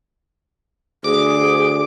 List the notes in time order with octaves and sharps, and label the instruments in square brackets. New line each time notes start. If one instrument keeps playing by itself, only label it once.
[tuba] D2 [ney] G#4 [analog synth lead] D6